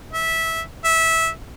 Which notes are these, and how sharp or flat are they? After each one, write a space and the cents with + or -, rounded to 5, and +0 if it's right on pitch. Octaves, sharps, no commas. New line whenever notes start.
E5 -15
E5 -15